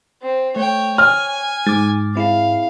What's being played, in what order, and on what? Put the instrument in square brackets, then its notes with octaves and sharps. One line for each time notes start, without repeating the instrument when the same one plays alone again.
[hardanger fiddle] C4
[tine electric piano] A3 [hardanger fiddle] C#5 G5
[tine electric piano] C#5 [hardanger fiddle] G#5 [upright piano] F6
[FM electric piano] G#2 [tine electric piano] D6 A6
[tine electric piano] C4 E4 G#4 [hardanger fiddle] F5